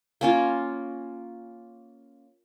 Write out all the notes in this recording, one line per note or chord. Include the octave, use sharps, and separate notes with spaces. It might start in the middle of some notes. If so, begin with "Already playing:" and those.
A#3 C#4 F4